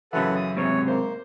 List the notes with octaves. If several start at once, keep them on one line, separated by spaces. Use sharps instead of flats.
F#2 C#3 E3 A4 B4 F#5
D#6
G#2 C3 C#5
A#3 C5